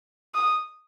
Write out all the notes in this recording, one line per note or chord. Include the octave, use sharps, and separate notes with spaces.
D#6